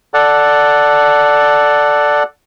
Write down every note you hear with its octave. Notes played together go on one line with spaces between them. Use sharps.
A4 D5 F#5